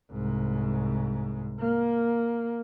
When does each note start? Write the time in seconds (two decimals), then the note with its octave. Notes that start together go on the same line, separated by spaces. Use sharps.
0.12 C2 G#2
1.59 A#3